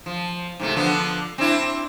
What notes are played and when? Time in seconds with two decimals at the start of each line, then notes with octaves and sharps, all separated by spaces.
0.06 F3
0.60 G#2 C3 A3
0.77 D3 F3 B3
1.38 C4 D4 E4